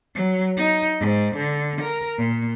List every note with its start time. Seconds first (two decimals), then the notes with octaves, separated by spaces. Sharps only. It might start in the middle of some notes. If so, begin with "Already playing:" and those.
0.14 F#3
0.57 D#4
1.00 G#2
1.35 D3
1.81 A#4
2.18 A#2